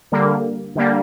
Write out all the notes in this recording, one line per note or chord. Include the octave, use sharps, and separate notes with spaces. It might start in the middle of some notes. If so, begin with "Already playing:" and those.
D3 G3 A#3
D3 G3 A#3